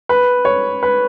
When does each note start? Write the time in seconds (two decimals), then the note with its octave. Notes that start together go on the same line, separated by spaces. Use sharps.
0.09 B4
0.45 C#5
0.83 B4